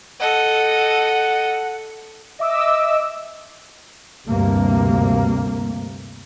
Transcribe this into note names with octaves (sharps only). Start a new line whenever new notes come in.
A4 D#5 F#5
D#5 E5 D6 E6
D2 G2 C3 A#3